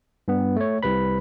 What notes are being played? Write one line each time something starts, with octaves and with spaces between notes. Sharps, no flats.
G2 B3
A3 C#5
C2 C3 B4 B5